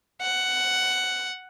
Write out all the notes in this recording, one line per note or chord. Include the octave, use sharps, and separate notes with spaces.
F#5